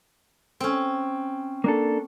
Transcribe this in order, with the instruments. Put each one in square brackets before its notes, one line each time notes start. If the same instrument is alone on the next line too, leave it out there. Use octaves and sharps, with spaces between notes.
[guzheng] C4 C#4
[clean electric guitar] A#3 D4 A4